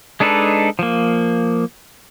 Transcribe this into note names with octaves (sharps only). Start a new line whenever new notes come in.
G#3 D4 D#4 A4 B4
F3 A#3